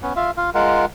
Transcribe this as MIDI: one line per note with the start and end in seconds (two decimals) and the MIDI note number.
0.02 0.13 59
0.02 0.13 61
0.16 0.31 65
0.16 0.31 76
0.16 0.31 77
0.37 0.50 65
0.37 0.50 77
0.55 0.85 56
0.55 0.85 65
0.55 0.85 70
0.55 0.85 78